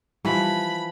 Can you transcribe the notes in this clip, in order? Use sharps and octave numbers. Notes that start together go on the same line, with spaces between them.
E3 F3 G3 B5